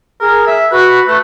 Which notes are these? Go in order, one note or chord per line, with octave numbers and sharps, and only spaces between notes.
G#4 A#4
E5
F#4 B4
A3 B4